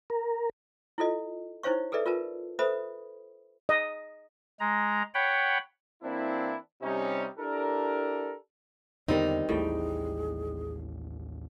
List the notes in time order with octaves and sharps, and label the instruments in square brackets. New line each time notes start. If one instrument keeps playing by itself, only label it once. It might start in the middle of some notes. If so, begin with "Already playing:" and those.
[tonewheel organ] A#4
[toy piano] E4 F4 A4 D#5
D#4 E4 C5 C#5 F5 C#6
G#4 A4 B4 D5 E5
F4 A#4 B4 A5
A4 B4 C5 E5 B5 D#6
[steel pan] D#5
[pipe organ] G#3 A#5
C#5 F#5 G5 B5
[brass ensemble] E3 A#3 C4 D4 E4
C3 G3 C#4 D#4
D4 E4 G4 A4 A#4
[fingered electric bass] E2 D3 B3 [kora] D#3 G3 C4 [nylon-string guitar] D#4 [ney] D5
[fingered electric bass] A1 D#2 [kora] A2 G3 G5 [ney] G#4